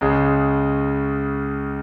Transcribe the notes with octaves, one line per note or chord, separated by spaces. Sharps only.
C#2 C#3 G#3